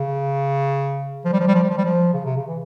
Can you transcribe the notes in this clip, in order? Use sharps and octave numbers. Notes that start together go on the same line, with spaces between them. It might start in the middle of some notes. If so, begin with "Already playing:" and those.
Already playing: C#3
F3
G3
F3
G3
F3
G3
F3
G3
F3
C#3
C3
C#3
E3